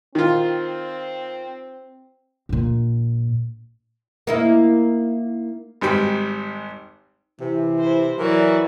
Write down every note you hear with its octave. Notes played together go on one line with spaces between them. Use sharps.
D#3 C4 F4
A#1 A#2
A#3 D#4 E4
G#1 G#2 G3 G5
C3 E3
E4 C5
E3 F#3 F#4 A#4 D5